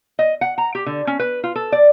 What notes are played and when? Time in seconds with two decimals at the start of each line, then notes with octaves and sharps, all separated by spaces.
0.19 D#5
0.41 F#5
0.58 A#5
0.75 G4
0.86 D3
1.07 C#4
1.19 B4
1.44 F4
1.56 A4
1.72 D5